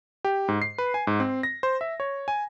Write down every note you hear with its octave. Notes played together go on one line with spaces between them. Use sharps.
G4
G#2
C7
B4
G#5
G#2
C4
A#6
C5
E5
C#5
G#5